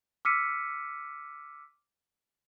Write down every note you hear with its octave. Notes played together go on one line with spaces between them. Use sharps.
D6 E6 F6 B6 C#7 D#7